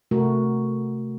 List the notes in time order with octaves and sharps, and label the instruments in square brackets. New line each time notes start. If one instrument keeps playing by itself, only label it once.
[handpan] C3 A3 F#4 A#4